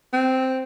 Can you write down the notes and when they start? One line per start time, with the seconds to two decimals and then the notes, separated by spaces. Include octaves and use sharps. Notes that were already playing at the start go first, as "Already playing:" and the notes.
0.13 C4